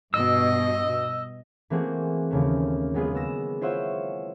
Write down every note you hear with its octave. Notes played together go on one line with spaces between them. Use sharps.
G2 B2 D#5 E6
E3 A3 A#3 C4 F#4 G#4
D#2 C#3 A3
F#3 G#3 B3 F4 G#4
B3 E6 A#6 E7
E4 F4 C5 C#5 E5 F#5